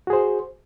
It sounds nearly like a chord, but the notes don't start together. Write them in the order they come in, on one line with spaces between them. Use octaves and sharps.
F#4 G#4 C5